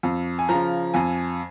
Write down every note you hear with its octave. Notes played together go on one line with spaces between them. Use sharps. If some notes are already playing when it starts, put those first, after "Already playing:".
F2
G#5
C#3 F3 A#5
F2 G#5